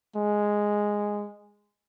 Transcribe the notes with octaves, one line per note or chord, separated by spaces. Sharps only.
G#3